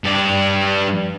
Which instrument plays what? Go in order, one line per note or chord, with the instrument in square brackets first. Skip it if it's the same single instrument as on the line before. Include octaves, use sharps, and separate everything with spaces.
[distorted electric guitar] G2 D5